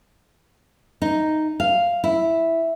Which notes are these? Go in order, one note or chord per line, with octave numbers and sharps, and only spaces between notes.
D#4
F5
E4